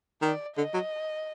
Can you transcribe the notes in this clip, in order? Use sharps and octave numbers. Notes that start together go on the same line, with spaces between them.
D#3 D5
D3 D#5
F#3